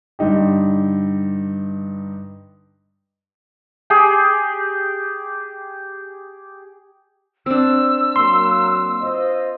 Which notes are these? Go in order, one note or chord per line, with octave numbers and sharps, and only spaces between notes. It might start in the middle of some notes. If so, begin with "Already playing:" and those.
G2 D3 D#4 G4
G4 G#4
C4 D4 E6
F#3 A#3 C6
F4 C5 D#5